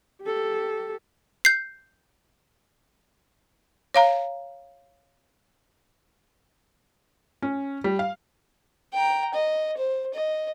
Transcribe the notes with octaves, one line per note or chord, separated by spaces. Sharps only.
G4 A4
G6 C7
C#5 F5 A#5
C#4
G3
F5
G5 A#5
D#5
C5
D#5